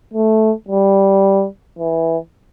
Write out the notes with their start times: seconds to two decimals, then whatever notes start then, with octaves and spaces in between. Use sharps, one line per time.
0.14 A3
0.69 G3
1.79 E3